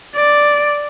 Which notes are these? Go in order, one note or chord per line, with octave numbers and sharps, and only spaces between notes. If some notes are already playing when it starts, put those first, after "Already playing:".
D5